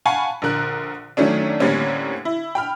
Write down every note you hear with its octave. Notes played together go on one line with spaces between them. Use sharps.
F5 F#5 G#5 A5 B5 C#6
A#1 D3 A#4 F#6
D#3 F#3 A3 C#4 D4
A2 D3 G3 A#3 C4 C#4
E4
G5 B5 F6